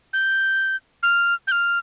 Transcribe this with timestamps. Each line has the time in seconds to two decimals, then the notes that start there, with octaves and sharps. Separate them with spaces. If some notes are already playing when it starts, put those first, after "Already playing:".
0.13 G6
1.03 F6
1.47 G6
1.52 F6